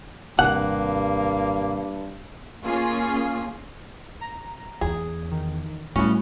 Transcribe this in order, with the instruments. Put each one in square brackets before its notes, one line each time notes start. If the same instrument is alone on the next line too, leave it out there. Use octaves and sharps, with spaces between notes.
[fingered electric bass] G#1 C3 [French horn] G2 [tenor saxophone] A#3 [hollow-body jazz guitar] F#5
[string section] A#3 C#4 F4 G#4
[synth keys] A#5
[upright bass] E2 [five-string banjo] G#4
[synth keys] D#3
[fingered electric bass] A2 [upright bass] G3 [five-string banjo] B3 C#4 [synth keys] F#4